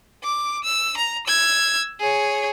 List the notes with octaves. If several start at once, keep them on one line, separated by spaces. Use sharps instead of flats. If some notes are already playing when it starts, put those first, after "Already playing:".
D6
E6
A#5
E6 G#6
G#4 C#5